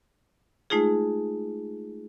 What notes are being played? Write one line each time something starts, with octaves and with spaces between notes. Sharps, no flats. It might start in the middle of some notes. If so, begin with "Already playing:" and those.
G#3 A3 D#4 F4 G#4